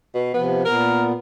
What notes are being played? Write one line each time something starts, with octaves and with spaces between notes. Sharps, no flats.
B2
C3 F3 B3
A#2 B3 A#4